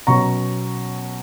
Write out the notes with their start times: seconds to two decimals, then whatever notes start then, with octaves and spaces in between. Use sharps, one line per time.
0.07 B2 F#3 C#4 A#5 C#6